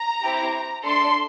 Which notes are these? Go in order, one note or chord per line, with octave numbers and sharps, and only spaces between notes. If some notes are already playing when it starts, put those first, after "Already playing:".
Already playing: A#5
C4 E4 G4
A3 D4 A4 C6